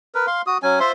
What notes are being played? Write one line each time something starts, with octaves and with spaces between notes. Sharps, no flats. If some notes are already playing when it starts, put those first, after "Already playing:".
A#4 B4
F5 C6
F#4 D#6
F#3 C#4 G#5
F4 C5 E5 C6